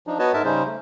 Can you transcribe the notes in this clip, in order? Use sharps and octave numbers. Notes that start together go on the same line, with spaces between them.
F3 D4 D#4
B3 F#4 B4 C#5 D#5 A5
G#2 G#3 A#4 E5 A5
C#3 G3 C#4 D#4 C5
A3